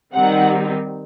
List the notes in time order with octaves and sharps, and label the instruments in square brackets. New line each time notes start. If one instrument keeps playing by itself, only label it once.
[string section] D#3 G3 C4 D#4 F#5